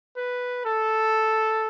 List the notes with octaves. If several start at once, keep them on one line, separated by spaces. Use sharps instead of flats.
B4
A4